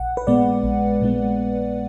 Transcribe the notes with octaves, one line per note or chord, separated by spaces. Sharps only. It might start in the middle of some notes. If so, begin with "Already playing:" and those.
Already playing: A#1 F#5
B4
A#2 G#3 B3 D5
A#1
A#2 G#3 B3